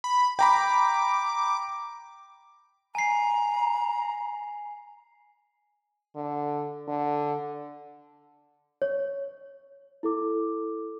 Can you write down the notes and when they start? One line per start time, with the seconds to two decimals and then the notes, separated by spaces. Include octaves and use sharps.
0.04 B5
0.39 G5 A#5 B5 D6
2.95 G#5 A#5 C7
6.16 D3
6.88 D3
8.82 C#5
10.03 E4 A4 D6